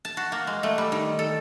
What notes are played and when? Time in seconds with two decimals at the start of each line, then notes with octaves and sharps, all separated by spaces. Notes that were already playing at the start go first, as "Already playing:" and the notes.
0.05 A5
0.17 F#4
0.32 A#3
0.47 G#3
0.63 A3
0.78 G3
0.92 D#3
1.19 A4